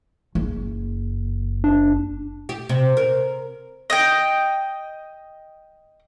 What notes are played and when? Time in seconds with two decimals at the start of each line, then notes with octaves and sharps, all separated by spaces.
0.35 F#1
1.64 D4
2.49 G4
2.69 C3
2.97 A#4
3.90 D#5 G5